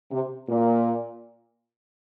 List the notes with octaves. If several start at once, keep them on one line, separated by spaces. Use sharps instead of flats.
C3
A#2